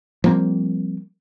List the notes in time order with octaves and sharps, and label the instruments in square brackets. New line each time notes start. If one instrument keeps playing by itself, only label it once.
[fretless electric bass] F3 G3 A#3 C4